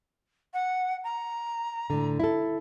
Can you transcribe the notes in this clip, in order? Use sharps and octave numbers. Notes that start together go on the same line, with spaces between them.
F#5
A#5
A2 D3
E4 A4